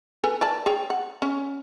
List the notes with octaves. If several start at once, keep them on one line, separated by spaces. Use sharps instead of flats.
A4 B4 G#5
A#4 D5 A5
G#4 C#5 G5
F#5
C#4